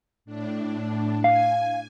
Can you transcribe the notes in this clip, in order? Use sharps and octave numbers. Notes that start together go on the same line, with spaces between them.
A2 D4
F5 G#5